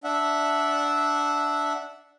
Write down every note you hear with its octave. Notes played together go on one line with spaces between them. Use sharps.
D4 E5 F#5